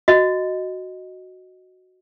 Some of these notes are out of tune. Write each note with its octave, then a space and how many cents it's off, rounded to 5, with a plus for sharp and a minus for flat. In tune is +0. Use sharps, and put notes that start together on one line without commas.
F#4 +0 D#5 +0